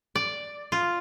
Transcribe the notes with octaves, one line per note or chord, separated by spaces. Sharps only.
D5
F4